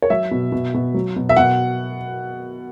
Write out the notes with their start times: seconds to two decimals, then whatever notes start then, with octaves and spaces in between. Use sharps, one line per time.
0.02 C#5
0.10 F#3 E5
0.31 B2
0.52 B2
0.74 B2
0.94 F#3
1.16 B2
1.29 E5
1.37 B2 F#5